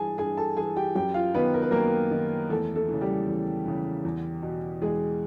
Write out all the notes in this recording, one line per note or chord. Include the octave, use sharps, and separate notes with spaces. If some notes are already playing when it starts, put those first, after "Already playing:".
Already playing: G2 E3 G#4 G#5 A5
G2 G#4 G#5
A4 A5
E3 G#4 G#5
G4 G5
F#2 G4 G5
F4 F5
D#3 B3 B4
A#4
B4
F#2 A#3 A#4
D#3
E2 A3 A4
A3 A4
C#3 E3
G3 G4
E2
C#3 E3
E2
B2
E2 G#3 G#4